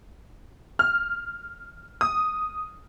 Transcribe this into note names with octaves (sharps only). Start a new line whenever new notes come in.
F6
D#6